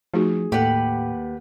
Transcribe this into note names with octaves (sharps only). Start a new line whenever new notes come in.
F3 A3 D#4 F#4 G#4
D#2 A2 G4 A4 B4 F#5